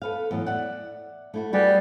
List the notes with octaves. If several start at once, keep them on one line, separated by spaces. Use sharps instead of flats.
A4 B4 F5
E2 A2 F#3
D5 E5 F#5
A3 E4 F#4
G3 F#4 G#4 B4